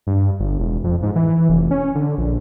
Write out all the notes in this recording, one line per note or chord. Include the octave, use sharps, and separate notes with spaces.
G2
G1
E1
F2
G#2
E3
F1
C#4
D3
A#1